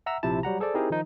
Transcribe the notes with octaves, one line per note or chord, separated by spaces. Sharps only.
E5 F#5 A#5 E6
A#1 C3 F3 E4 A5
F#3 G3 F#5 A#5
G#4 A4 C5 D5
C4 D#4 E4 G4 G#4 A#4
D#3 F3 D#4